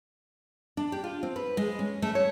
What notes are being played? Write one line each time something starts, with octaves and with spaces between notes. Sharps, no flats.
D4
G4
F4
C4
B4
G#3
C#4
A3
C#5